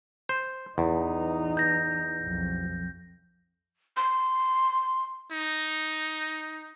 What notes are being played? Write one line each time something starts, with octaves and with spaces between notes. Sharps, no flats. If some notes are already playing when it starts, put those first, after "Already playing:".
C5
E2 E3 D#4
G6 A#6
B1 F2
C6
D#4